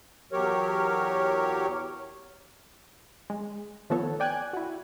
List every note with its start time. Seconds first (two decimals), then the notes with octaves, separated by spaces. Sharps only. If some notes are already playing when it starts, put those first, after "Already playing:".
0.32 E2 F#3 G4 A#4 C#5
3.30 G#3
3.90 D#3 F3 A3 B3 A4 C#5
4.20 D5 G5 G#5 F#6 G#6
4.53 E4 F#4